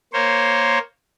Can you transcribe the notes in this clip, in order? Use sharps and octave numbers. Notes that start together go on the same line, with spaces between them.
A#3 C5 C#5